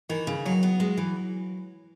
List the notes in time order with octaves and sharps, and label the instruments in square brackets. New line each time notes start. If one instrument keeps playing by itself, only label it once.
[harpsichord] D#3 [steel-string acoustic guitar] E3
[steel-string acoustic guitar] C#3
[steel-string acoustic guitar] D#2 [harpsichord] F#3
[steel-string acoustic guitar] B3
G#3
E3